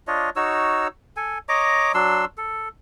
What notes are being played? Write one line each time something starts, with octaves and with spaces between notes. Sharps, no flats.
D4 F4 C#5 D#5
D#4 F#4 C#5 E6
A4 G#5
C#5 D#5 A#5 D6
F#3 D4 C6 E6
A4